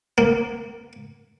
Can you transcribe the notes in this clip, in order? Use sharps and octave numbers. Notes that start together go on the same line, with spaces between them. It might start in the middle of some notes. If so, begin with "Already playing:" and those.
A#3